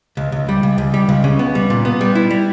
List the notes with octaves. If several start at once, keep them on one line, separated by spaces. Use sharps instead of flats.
C#2
C#2
G3
C#2
C#2
G3
C#2
C#3
B3
G3
A#2
B3
G3
E4
G3